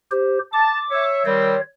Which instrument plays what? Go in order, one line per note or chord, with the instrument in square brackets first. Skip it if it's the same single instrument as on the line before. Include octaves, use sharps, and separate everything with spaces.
[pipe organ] G4 C5
[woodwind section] A5 [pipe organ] D6
[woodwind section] C#5 E5
[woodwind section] D#3 G3 C4 [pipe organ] C#5